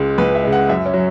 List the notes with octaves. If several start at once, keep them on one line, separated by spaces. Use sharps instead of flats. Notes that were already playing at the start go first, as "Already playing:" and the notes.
Already playing: C#2 C#3 G#3
C#2 B4
E5
C#3 G#3
F#5
F#2 E5
C#4
F#3